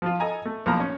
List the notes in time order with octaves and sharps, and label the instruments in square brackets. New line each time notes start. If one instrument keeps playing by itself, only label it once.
[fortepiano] F3 F4
A4 D#5 G#5 A#5
A3
B1 F3 A#3 A#5
C#4